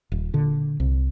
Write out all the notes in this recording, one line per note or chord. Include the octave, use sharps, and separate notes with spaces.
D#1
A#2 D3
C2